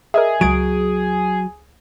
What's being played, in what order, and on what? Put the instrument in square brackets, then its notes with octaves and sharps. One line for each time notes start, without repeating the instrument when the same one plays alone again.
[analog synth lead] G#4 [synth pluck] A#4 D#5 E5
[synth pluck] C#2 G#6 D7 [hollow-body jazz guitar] F#3